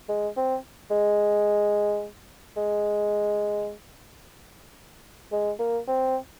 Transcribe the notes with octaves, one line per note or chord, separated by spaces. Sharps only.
G#3
C4
G#3
G#3
G#3
A#3
C4